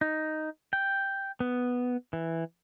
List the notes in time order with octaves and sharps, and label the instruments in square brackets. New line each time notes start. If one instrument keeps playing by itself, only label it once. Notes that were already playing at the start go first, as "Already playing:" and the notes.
[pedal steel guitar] D#4
G5
B3
E3